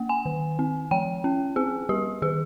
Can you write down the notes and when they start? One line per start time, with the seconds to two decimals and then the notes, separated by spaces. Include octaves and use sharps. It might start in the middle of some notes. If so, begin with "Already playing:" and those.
Already playing: A#3
0.09 G#5
0.25 D#3
0.59 C4
0.91 F3 G5
1.24 C#4
1.56 C4 G#4
1.89 G3 G4
2.22 D#3 G#4